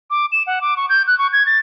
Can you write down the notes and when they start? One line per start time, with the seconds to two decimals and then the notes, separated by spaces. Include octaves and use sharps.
0.10 D6
0.32 E7
0.47 F#5
0.61 D6
0.77 C#6
0.89 G6
1.07 F#6
1.18 C#6
1.33 G#6
1.46 A6